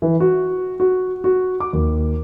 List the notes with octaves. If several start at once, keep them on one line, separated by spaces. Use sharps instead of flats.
E3
F#4
F#4
F#4
D6
D#2